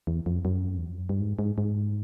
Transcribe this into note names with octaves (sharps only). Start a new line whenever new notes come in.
E2
F2
F#2
E2
F2
F#2
G2
G#2
G#2
G#2